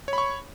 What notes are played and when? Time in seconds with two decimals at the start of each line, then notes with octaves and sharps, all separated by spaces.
0.08 C#5
0.13 B5
0.18 C#6